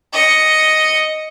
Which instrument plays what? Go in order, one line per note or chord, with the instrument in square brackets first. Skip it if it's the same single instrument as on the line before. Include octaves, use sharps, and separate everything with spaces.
[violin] D#5 C#7